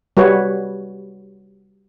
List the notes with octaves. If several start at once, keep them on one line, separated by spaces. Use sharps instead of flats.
G3 F#4 B4 C#5